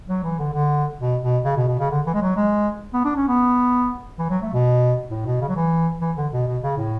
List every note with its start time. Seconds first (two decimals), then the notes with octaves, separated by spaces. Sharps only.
0.09 F#3
0.23 E3
0.39 D3
0.54 D3
1.00 B2
1.22 B2
1.45 C#3
1.57 B2
1.68 B2
1.79 C#3
1.90 D3
2.06 E3
2.14 G#3
2.22 F#3
2.36 G#3
2.94 B3
3.05 D4
3.16 C#4
3.28 B3
4.19 E3
4.30 F#3
4.42 A3
4.53 B2
5.11 A2
5.26 B2
5.41 C#3
5.49 F#3
5.56 E3
6.01 E3
6.17 D3
6.33 B2
6.47 B2
6.63 C#3
6.77 A2